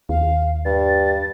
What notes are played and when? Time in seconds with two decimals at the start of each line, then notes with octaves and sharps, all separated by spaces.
0.09 D#2 F5
0.65 G2 A6